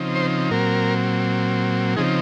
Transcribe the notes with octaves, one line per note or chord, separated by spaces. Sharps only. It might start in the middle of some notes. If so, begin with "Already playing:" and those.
Already playing: C#3 F3 C4 D#4
C5
A#2 F#3 C4 A#4
C#3 F3 C4 D#4 G#4